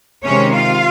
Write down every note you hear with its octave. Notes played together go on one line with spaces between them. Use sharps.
C3 D#3 G#3 C#4 C#5
F4 F5